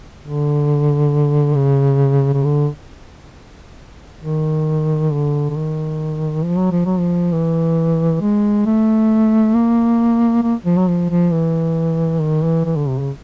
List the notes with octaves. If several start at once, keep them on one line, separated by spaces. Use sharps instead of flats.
D3
C#3
C#3
D3
D#3
D3
D3
D#3
F3
F#3
F3
F#3
F3
E3
G#3
A3
A#3
A#3
F3
F#3
F3
F3
E3
D#3
E3
E3
D3
C3
C#3